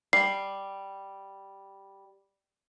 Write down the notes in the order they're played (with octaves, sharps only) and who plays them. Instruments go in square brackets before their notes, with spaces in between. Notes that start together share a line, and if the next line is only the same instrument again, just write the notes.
[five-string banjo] G3 [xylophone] C7